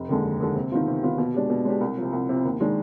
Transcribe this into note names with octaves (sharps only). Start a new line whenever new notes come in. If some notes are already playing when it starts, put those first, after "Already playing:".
Already playing: F1
D#2 D3 G#3
F1
D#2 D3 G#3
C3
D#3 B3 F4
C3
D#3 B3 F4
B2
G#3 D4 G4
B2
G#3 D4 G4
C2
C3 F3
C2
C3 F3
D#2
D#3 G#3 D4